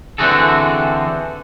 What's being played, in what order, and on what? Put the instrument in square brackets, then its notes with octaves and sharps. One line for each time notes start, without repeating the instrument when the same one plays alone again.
[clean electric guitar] D3 E3 C4 F#4 G#4 A4